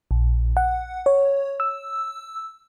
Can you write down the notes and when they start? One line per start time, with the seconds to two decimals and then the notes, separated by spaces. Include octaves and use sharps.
0.11 A#1
0.57 F#5
1.06 C#5
1.60 E6